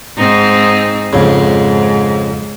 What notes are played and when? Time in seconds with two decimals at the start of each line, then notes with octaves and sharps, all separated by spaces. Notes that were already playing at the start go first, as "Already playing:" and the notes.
0.17 G#2 C4 D#4
1.13 F2 G#2 C#3